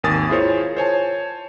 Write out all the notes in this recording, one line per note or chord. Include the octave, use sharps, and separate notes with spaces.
G#1 D#2 A#4 G#5 D#6 A6
E4 F4 G#4 A#4 C5 C#5
C5 C#5 G#5 A5